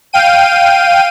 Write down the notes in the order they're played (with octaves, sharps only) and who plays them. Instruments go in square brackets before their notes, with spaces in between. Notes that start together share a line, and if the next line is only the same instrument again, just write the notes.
[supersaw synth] F5 G5 D#7